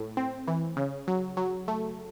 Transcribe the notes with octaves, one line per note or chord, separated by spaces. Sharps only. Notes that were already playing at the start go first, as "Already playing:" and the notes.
Already playing: A2
C4
E3
C#3
F#3
F#3
A3